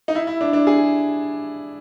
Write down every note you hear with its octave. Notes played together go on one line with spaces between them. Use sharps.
D#4
E4
E4
D4
D4
G#4